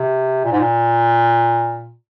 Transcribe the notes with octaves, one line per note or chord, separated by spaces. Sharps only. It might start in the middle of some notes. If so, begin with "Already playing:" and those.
Already playing: C3
A#2
G#2
A#2